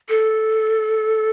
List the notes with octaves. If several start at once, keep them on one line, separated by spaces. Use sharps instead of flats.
A4